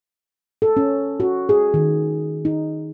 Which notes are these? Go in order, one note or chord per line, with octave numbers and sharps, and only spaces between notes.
A4
C#4
F#4
G#4
D#3
D#4